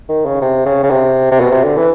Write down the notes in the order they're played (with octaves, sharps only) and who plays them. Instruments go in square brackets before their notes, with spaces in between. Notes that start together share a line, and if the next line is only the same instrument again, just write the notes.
[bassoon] D#3
C#3
C3
C#3
C#3
C3
C3
B2
C3
D3
E3